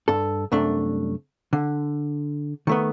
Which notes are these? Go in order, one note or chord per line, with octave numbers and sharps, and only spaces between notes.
G2 A4
C2 F#2 A3 D4
D3
D#3 A3 B3